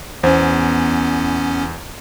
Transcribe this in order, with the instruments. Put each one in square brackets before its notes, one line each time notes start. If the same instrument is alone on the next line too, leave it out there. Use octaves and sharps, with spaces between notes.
[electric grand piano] E2 [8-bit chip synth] B3 C#4 [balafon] C5